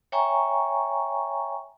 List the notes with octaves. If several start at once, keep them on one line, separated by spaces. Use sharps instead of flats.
C#5 E5 G5 G#5 A#5 C#6